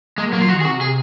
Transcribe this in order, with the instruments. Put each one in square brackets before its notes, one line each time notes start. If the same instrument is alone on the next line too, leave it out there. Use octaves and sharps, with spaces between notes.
[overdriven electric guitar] G#3 [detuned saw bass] A#3
[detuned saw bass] F#3
[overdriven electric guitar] A#3
[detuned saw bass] F#3 [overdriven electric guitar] F4
[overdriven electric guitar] F#4
[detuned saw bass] D#3
[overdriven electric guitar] G#4
[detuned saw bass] C3 [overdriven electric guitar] F#4
[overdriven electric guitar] G#4